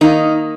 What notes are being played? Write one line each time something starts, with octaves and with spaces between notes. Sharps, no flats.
D#3 A#3 D#4